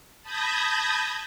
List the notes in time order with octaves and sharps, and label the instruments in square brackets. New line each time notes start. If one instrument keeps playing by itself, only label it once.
[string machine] A5 B5 D#6 G6 G#6 A#6